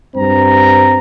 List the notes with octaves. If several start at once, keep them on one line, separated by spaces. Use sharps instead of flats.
G2 C4 A#5